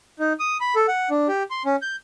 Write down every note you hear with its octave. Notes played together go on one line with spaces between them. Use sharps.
D#4
D#6
B5
A4
F#5
D4
G4
C6
C#4
G6